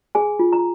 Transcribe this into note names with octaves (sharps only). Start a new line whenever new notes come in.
G#4 G#5
F4
A#5